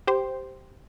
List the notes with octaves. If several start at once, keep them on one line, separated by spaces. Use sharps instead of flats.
G4 C5